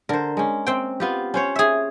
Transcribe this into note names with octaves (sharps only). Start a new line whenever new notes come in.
D3 A#4 C5
G#3 C#4
C4 G5
B3 F4 G4
C#4 C5 C#5
G#4 E5